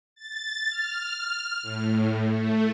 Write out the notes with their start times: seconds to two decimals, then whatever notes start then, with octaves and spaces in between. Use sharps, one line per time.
0.15 A6
0.69 F6
1.62 A2
2.27 A3